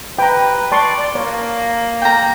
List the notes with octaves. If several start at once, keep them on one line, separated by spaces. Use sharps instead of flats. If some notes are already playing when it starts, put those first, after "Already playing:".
B4 G5 A#5
D5 A5 C6 C#6
A#3 C#5
G5 A#5